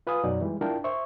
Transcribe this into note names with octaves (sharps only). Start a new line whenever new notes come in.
F4 B4 F5 G#5 D#6
F#2 B2 F#3 D#4 D5
E3 G3 G#3
D4 E4 F4 A#4 G5 A5
C5 E5 C#6